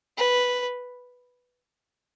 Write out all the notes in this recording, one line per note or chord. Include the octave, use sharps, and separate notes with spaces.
B4